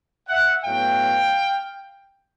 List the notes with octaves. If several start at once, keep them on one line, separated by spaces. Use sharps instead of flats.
E5 F#5
A2 F#3 B3 F5 G5